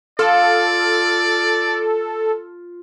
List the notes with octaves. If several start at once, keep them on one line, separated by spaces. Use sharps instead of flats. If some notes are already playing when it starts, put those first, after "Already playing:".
F4 A4 D5